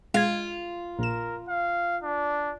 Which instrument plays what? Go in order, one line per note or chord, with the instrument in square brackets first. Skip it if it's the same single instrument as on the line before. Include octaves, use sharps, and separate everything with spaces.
[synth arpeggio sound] G#3 G#6 [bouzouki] F4
[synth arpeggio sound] A#1 E7 [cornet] A#4
[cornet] F5
D4